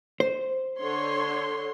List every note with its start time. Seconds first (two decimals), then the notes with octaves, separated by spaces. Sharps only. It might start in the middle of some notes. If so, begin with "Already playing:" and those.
0.20 C5
0.80 D3 C#5 C6